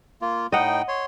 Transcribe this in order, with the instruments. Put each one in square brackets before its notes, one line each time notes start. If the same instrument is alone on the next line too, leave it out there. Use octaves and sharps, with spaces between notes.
[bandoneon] A#3 F4
[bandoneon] A2 D#4 G5 [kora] D#5 F#5
[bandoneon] C#5 C6